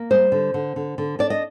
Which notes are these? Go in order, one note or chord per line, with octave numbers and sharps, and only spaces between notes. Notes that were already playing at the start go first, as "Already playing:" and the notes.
Already playing: A#3
G3 C5
D3
D3
D3
D3
D4 D5
D#5